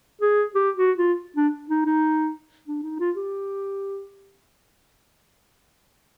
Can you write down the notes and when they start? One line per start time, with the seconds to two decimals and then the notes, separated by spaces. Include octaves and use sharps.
0.21 G#4
0.55 G4
0.77 F#4
0.98 F4
1.36 D4
1.70 D#4
1.86 D#4
2.68 D4
2.83 D#4
3.00 F4
3.16 G4